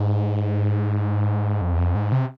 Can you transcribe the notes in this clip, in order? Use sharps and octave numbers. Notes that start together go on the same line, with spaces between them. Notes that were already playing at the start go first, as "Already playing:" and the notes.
Already playing: G#2
F2
E2
F2
G#2
C3